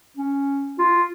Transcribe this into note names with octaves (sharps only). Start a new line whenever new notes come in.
C#4
F4